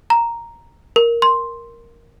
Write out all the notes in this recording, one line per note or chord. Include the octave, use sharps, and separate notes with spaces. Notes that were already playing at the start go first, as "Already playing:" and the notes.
A#5
A#4
C6